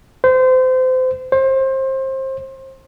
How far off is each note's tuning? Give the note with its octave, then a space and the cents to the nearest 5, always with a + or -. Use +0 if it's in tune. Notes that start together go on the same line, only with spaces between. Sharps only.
C5 -30
C5 +25